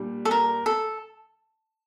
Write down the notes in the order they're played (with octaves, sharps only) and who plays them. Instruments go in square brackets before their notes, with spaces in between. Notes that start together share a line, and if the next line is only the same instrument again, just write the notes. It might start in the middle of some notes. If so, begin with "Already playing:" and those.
Already playing: [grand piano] A#2 G3 D4
[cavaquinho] A4
A#4
A4